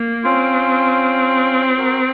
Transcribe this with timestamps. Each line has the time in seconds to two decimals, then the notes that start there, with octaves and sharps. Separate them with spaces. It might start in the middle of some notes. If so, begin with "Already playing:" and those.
Already playing: A#3
0.24 C4 C#4 F4
1.78 F#4 A#4